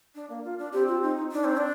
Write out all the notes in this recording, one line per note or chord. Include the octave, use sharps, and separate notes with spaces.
D4
A#3
F4
D4
C4 G4
F4
D#4
D4 D#4
C4
D4